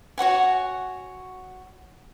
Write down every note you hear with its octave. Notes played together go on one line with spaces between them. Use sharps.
F#4 C#5 F#5 G#5